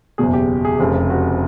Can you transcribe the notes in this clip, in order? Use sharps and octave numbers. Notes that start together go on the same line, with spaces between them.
F#1 E2 B2 G#4
G4
G#4
F1 F2 C#3 G4
F#4